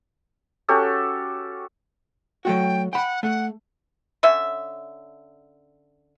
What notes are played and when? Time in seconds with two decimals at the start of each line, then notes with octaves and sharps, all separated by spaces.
0.68 C#4 F#4 G4 A4
2.45 F#3 A3 F#4 G5
2.93 F#5 G5 B5
3.23 A3 F#5
4.23 D3 C#4 E5